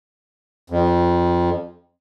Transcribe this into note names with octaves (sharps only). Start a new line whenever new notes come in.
F2